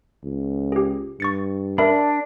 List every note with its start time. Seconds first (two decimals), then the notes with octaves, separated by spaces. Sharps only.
0.23 C#2
0.72 G4 G#4
1.20 G2 C#6 A6 C#7
1.78 D4 A#4 E5 B5